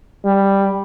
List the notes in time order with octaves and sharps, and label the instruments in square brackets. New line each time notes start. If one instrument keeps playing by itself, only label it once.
[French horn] G3